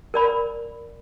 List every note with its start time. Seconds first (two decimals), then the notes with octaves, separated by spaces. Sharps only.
0.14 A#4 D5 B5